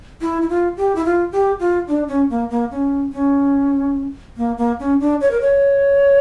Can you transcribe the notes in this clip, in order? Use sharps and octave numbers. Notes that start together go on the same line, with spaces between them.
E4
E4
F4
G4
E4
F4
G4
F4
D4
C#4
A#3
A#3
C#4
C#4
A#3
A#3
C#4
D4
C#5
A#4
C#5